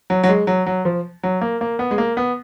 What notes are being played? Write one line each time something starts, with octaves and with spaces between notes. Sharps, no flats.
F#3
F#3
G#3
F#3
F#3
F3
F#3
A#3
A#3
B3
G#3
A#3
B3